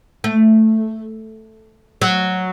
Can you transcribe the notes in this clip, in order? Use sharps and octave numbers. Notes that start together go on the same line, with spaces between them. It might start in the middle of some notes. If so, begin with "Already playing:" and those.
A3
F#3